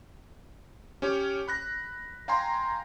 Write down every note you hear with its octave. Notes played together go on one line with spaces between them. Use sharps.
C#4 G4 C#5 D6
B5 F#6 A#6
F5 G5 G#5 A#5 C6